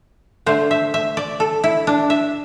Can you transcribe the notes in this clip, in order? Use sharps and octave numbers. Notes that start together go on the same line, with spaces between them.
D3 A3 C5
E5
E5
D5
A4
E4
D4
E5